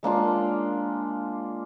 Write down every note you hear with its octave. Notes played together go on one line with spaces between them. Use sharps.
G#3 A#3 D4 F4